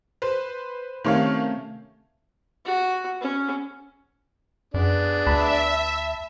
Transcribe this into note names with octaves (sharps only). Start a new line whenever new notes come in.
B4 C5
C3 D#3 A3 C#4 C#5 F5
F#4
C#4
F#2 B3 D4 G#4
D2 E5 A5 B5